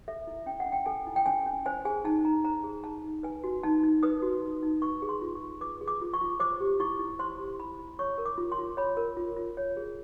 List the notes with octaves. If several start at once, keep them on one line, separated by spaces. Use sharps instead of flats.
A4 E5
E4
C#4 G5
F#5
C#4
G5
A4 G#5
E4
G5
C#4 G#5
C#4
C5 G#5
G#4 G#5
D#4 A5
D#4 A#5
C5 A#5
G#4
D#4 A5
D#4
B4 G#5
F#4
D#4 A5
D#4
B4 D#6
F#4
D#4
D#4
B4 C#6
G#4
C6
F4
C#6
F4
B4 D6
G#4
D6
F4
C#6
F4
C5 D6
G4
E4 C#6
E4
C5 C6
G4
E4 B5
E4
C#5 C#6
A#4
D6
F4
C6
F4
C#5 B5
A#4
F4
F4
C#5
G#4